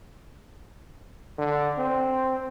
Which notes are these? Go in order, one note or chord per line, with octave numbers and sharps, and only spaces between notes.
D3
C4